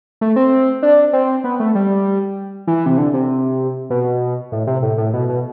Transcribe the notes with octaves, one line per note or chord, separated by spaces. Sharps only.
A3
C4
D4
C4
B3
A3
G3
E3
C3
D3
C3
B2
A2
C3
A2
A2
B2
B2